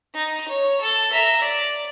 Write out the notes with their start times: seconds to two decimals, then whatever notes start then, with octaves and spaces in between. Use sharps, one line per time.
0.14 D#4
0.49 C#5
0.81 A4
1.12 E5 A#5
1.41 D5